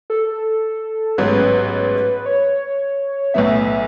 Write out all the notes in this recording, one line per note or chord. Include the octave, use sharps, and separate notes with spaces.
A4
A1 G#2 F#3 B3 B4
C#5
B1 A2 F#3 B3 E5